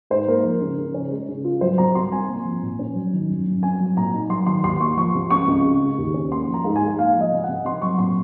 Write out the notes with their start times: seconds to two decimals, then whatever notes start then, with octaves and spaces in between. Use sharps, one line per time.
0.10 G#2 C5
0.28 A#3 A#4
0.44 F3
0.61 C#3
0.78 C#3
0.94 C#4
1.11 G#3
1.29 C#3
1.45 F4
1.61 F#3 C5
1.78 C3 A#5
1.95 C2 C6
2.12 C4 G#5
2.28 A#3
2.45 F3
2.62 A#2
2.79 C#4
2.95 F#3
3.13 D#3
3.29 F#2
3.47 F#2
3.62 C4 G#5
3.80 F#3
3.97 A#2 A#5
4.13 D#4
4.29 F#3 C6
4.46 D#3 C6
4.63 D#2 C6
4.81 A#3 C#6
4.97 F3 C#6
5.14 C3
5.30 C#2 C#6
5.47 C#2
5.64 G#3
5.80 C#3
5.98 D#2
6.14 C#4
6.31 A#3 C6
6.48 F3
6.54 A#5
6.65 G#2
6.76 G#5
6.82 G#2
6.98 A#3 F5
7.15 F3
7.21 D#5
7.32 C3
7.44 C3 F#5
7.65 C4 C6
7.82 F#3 C#6
7.98 A#2 C6